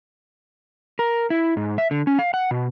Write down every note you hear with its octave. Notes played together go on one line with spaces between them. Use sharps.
A#4
E4
G#2
E5
D3
C#4
F5
F#5
B2